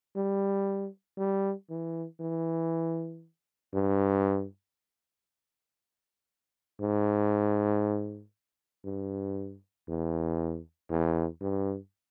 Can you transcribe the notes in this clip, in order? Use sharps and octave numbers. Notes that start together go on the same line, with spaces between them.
G3
G3
E3
E3
G2
G#2
G2
E2
E2
G2